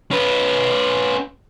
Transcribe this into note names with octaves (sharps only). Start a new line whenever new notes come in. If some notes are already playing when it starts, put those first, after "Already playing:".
C#4 B4